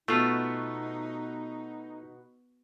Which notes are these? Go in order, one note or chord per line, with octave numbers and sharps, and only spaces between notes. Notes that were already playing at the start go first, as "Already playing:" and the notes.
B2 A3 D#4 F4